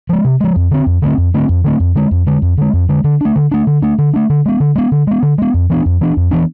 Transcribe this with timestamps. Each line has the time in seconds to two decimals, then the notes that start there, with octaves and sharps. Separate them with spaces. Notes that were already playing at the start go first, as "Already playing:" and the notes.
0.09 F3 G#3
0.24 C3
0.40 F3 G#3
0.56 F2
0.71 D3 A3 C4
0.87 F2
1.02 D3 A3 C4
1.18 F2
1.34 D3 A3 C4
1.49 F2
1.64 D3 A3 C4
1.80 F2
1.95 D3 G#3
2.11 F2
2.27 D3 G#3
2.42 F2
2.58 D3 G#3
2.74 F2
2.89 D3 G#3
3.04 D3
3.21 A3 D4
3.35 D3
3.51 A3 D4
3.67 D3
3.82 A3 D4
3.98 D3
4.13 A3 D4
4.30 D3
4.46 G#3 B3
4.60 D3
4.75 G#3 B3
4.92 D3
5.07 G#3 B3
5.22 D3
5.38 G#3 B3
5.54 F2
5.70 E3 B3 D4
5.86 F2
6.01 E3 B3 D4
6.17 F2
6.31 E3 B3 D4